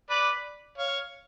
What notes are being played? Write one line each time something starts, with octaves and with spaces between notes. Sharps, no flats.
B4 D5
C#5 F5